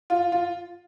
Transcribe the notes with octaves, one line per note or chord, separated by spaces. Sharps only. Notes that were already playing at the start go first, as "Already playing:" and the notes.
F4
F4